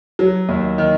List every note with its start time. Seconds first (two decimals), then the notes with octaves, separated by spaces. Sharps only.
0.19 F#3
0.49 D#2
0.78 D#3